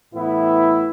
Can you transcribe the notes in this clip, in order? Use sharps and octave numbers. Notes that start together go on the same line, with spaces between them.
A2 E3 B3 E4